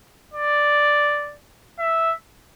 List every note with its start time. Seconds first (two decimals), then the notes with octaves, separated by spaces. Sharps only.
0.34 D5
1.79 E5